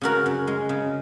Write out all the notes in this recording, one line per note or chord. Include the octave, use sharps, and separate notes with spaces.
C#3 F#4 A#4
F#2
G#3
C#3